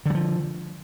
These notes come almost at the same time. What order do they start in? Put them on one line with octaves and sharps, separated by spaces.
D3 F#3 F3